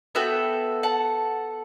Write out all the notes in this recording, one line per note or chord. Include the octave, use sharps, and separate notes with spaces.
B3 F#4 A4 E5 G5
F#5 A5